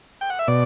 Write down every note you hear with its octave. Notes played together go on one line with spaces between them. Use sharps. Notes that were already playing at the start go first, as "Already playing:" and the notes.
G5
F#5
E5
B2 D5